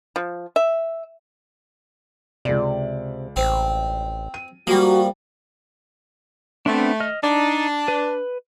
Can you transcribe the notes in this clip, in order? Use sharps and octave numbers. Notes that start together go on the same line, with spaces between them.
F3
E5
C#2 C3 D5
A1 C4
D#7
F3 G3 A#3 F#4
A3 B3 C4 D4
D#5 F6
D4 D#4
B4